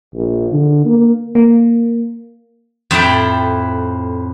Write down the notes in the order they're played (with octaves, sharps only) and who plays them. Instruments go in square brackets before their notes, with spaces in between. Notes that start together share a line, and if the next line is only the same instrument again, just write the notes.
[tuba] A#1
D3
A#3
[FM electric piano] A#3
[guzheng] F2 A2 E4 G5